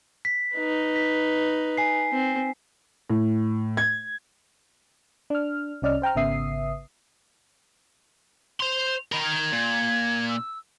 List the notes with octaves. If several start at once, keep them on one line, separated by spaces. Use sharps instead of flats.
B6
D#4 B4
B6
G#5 C7
C4
A2
G#6
D4 F6
C2 C#4 D5 D#5 F6
C5 G5 A#5 F6
G#1 C#3 B3 E5 D#6 C7
C5 C6 F7
D#3 A#4 B5
G#6
A#2
E6